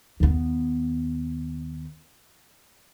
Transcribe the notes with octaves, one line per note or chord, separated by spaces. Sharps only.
D#2 B3